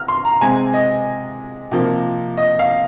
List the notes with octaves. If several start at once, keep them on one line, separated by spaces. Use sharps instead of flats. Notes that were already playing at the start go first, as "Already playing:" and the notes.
Already playing: F6
C6
A#5
C3 G#3 C4 G#5
D#5
C3 F3 A#3
D#5
F5